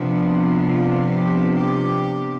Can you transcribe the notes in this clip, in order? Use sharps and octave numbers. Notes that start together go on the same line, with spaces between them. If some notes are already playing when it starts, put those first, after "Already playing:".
Already playing: C3 F3 B3 D4
F4
G4
G4